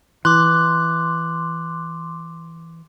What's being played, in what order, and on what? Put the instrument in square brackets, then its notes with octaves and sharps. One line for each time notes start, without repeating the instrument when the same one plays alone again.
[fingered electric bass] E3 [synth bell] C6 D6 [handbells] F#6